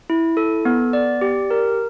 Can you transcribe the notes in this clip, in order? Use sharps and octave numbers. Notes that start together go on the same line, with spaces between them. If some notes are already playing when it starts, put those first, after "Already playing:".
E4
A4
B3
D5
G4
A#4